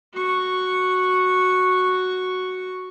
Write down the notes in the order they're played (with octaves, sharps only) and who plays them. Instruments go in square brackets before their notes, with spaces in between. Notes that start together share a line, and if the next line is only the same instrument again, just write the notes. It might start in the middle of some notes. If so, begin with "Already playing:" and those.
[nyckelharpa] F#4 C#6